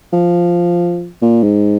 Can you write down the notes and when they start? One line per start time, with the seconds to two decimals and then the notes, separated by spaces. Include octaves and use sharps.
0.13 F3
1.22 A#2
1.43 G#2